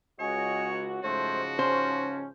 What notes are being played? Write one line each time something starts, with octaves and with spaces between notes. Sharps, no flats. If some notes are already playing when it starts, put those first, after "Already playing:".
C#2 F#4 C#5 D#5 G#5
G#2 C#3 F3 A3 F#4 C5
C#4 C5